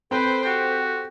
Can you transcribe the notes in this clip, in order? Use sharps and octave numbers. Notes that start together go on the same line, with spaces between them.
C4 A4 B4 C5 G5
F#4 G4